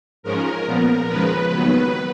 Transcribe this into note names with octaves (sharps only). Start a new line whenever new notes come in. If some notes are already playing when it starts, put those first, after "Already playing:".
G#2 F3 G#3 C#4 A#4
A#2 F3 B3
D#2 C#3 F3 G#3 B4
D#2 D#3 F#3 B3 B4